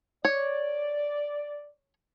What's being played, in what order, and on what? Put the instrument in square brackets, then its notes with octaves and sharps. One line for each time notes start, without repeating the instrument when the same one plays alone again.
[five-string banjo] C#5 [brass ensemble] D5